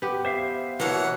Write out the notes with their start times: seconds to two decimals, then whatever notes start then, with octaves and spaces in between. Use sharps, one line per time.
0.02 B3 G4
0.25 C5 E5 F5
0.80 B2 E3 A#3 C#5 F#5